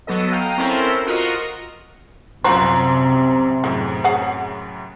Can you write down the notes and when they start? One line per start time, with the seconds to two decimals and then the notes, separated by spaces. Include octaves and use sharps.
0.07 F#3 B3 A4 D#5
0.32 F5 G5 A#5 D#7
0.58 C4 C#4 E4 A4 A#4 C5
1.06 F4 F#4 A#4 D#5
2.44 C2 F#2 C3 F4 F#4 C5 A#5 C6
3.64 F#2 A2 G#3
4.04 G#4 C#5 F#5